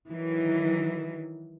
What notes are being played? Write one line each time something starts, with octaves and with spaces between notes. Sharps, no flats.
D#3 E3 F#3